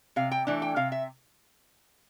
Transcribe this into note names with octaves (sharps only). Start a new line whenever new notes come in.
C3 F5
G5
E3 A3 D4
G5
C3 F5
E5